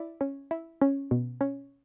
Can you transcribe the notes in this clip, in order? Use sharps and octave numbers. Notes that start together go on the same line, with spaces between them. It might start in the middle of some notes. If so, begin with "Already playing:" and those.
Already playing: E4 D5
C#4
E4
C#4
B2
C#4